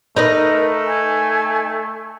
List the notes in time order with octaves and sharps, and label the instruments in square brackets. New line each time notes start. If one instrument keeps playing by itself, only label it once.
[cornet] A3 [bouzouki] D#4 B4 D#5 [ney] A#4
[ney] G#5